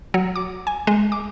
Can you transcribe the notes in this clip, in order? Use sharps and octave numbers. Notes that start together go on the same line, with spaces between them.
F#3
D6
G#5
G#3
D6